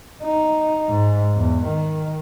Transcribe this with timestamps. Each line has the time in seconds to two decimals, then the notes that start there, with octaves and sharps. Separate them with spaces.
0.23 D#4
0.89 G#2
1.37 E2
1.67 D#3